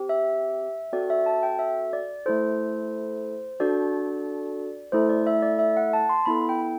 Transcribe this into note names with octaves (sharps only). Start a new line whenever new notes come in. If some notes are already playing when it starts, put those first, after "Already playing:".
Already playing: C4 G4
E5
C4 F#4 A4 D5
E5
A5
G5
E5
D5
A3 E4 A4 C5
D4 F#4 A4 D5
A3 E4 A4 C5
D5
E5
D5
E5
F#5
A5
C6
B3 E4 A4 B5
G5